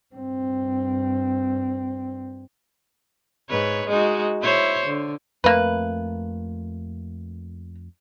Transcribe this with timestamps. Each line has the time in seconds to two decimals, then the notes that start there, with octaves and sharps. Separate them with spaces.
0.15 G2 C4
3.49 G#2 B4 C#5
3.88 G#3 D#4 F#4
4.42 E4 C5 C#5
4.86 D3
5.44 F2 A3 A#3 B4